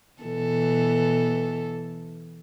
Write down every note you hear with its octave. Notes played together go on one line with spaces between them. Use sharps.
B2 E3 A4